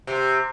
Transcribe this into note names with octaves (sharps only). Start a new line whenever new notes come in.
C3